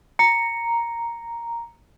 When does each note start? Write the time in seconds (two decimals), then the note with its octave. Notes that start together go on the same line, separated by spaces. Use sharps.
0.19 A#5 C#7